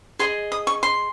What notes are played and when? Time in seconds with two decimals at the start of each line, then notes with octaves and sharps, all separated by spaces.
0.19 G#4 D#5 C6
0.52 D#6
0.67 C#6
0.83 C6